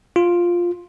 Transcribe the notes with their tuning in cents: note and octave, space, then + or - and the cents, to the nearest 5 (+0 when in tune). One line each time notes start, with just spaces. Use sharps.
F4 +5